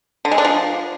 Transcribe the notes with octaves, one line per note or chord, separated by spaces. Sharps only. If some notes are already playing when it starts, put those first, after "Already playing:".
D3
G#3
D4
F3